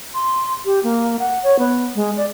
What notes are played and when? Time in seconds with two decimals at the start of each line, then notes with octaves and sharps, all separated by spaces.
0.14 C6
0.65 G4
0.83 A#3
1.19 F#5
1.44 C#5
1.59 B3
1.95 G#3
2.17 D5